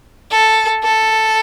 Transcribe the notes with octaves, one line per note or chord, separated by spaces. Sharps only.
A4
A4